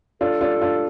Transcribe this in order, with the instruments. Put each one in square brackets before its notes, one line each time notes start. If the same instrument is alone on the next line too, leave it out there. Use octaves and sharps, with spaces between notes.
[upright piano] D4 F4 [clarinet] A4
[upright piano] D4 F4
D4 F4